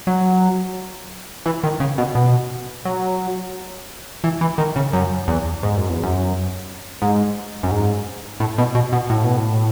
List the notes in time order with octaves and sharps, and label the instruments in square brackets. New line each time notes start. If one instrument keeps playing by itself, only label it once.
[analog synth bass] F#3
E3
D#3
C#3
B2
B2
F#3
E3
E3
D#3
C#3
F#2
E2
G#2
F#2
E2
F#2
G#2
F#2
G#2
A2
B2
B2
B2
A2
B2
A2